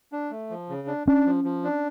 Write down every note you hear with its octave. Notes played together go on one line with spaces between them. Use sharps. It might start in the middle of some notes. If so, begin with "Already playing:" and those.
D4
A3
F3
C#3
D4
C#4 D4
F3
F3
D4